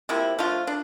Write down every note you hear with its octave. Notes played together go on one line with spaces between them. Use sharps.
C3 F3 A#3 E4
F3 A3 D4 F4
D4